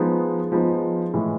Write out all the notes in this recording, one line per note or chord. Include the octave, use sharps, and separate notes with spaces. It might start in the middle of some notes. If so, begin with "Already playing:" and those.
Already playing: F3 G#3 B3 D#4
F3 G#3 B3 D#4
A2 E3 G#3